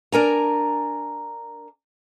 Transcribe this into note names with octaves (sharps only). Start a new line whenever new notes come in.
D4 A#4 G#5 A#5